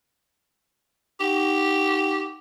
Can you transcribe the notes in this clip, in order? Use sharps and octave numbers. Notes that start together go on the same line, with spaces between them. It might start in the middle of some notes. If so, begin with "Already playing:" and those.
D#4 G4 F#5